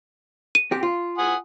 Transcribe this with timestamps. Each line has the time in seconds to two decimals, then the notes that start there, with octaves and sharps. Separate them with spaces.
0.55 D#7
0.71 C4 G4
0.83 F4
1.18 F#5 G#5 D#6